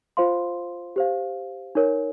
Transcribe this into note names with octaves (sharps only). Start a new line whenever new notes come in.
F4 C5 F5 C6
G4 C5 F5
D#4 A#4 C#5